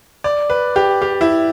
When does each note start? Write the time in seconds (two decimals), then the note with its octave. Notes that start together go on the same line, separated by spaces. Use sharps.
0.24 D5
0.50 B4
0.76 G4
1.02 G4
1.21 E4